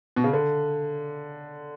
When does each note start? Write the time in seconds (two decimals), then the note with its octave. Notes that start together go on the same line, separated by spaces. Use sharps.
0.16 B2
0.24 C#3
0.33 D3